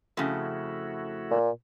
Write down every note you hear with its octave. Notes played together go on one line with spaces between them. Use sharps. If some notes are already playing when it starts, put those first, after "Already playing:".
F2 C#3 A3 E4 F#4
A#2